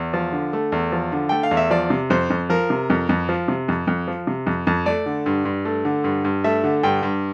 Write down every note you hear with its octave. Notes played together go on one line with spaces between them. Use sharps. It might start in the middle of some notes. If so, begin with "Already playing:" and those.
Already playing: E2
F3
D3
A3
E2
F3
D3
A3 G5
F5
E2
E5
F3 D5
C3
F2 C5
F2
F3 A#4
C3
F2
F2
F3
C3
F2
F2
F3
C3
F2
F2
A3 D5
D3
G2
G2
A3
D3
G2
G2
A3 E5
D3
G2 G5
G2